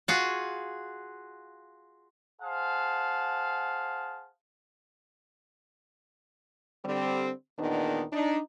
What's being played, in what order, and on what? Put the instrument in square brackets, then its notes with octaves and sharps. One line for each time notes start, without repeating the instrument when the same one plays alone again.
[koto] F4 F#4 G#4
[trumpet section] G#4 C5 F5 F#5 A5
[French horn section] D3 G3 C4
E2 A#2 D#3 B3 D4 D#4
D4 D#4